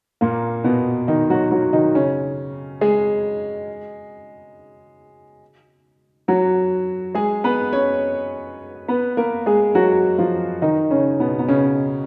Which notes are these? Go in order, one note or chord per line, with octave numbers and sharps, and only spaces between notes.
A#2 A#3
B2 B3
D#3 D#4
F#3 F#4
F#3 F#4
D#3 D#4
C#3 C#4
G#3 G#4
F#3 F#4
G#3 G#4
B3 B4
C#4 C#5
B3 B4
A#3 A#4
G#3 G#4
F#3 F#4
F3 F4
D#3 D#4
C#3 C#4
B2 B3
B3
C#3 C#4